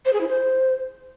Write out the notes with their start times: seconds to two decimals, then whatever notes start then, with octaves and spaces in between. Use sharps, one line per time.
0.05 C5
0.13 G#4
0.21 E4
0.29 C5